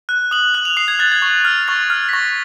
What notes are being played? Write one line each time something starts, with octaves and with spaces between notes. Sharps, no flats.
F#6
D#6 F#7
F#6 F#7
F7
D#6 C7
G#6
F#6 A6
G#6
C#6
F6
C#6 A6
F6
B6
C#6 A#6